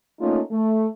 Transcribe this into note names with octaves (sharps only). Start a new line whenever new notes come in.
A3 A#3 C#4 D#4 F4
A3